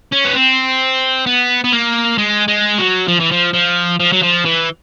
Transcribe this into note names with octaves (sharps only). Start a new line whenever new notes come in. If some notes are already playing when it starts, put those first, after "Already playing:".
C#4
B3
C4
B3
B3
A#3
G#3
G#3
F#3
F3
E3
F3
F3
F3
F#3
F3
E3